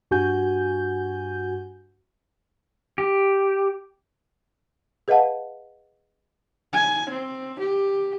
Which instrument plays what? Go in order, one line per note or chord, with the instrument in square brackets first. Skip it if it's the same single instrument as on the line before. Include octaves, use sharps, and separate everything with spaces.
[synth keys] G2 F#4 G#5 G6
[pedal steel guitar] G4
[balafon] G#4 B4 D#5 F5 F#5 A5
[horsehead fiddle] G#5
C4
G4